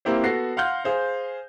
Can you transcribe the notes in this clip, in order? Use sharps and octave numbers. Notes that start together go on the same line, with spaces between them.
A#3 C4 E4 G4 C5
B3 F#4 A4 A#6 C7
F5 F#5 C6 F6 G6
G#4 C5 F5